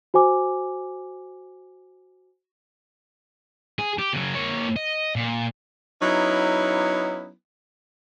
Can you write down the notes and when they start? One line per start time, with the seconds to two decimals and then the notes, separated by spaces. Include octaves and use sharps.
0.14 F#4 C5 G#5 D6
3.79 G#4
3.98 G4
4.13 C#3 F#3
4.35 A#3 C#5
4.76 D#5
5.16 A#2
6.02 F#3 B3 C#4 D#4 E4